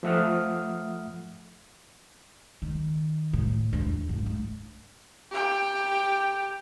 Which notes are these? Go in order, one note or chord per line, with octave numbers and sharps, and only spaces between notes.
F3 A3 E5 F#5 D#6 F6
D#3
A2
E2 D4
G#2
A3
G4 G5